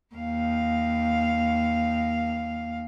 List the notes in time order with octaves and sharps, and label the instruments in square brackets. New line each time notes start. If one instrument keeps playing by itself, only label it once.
[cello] D#2 F5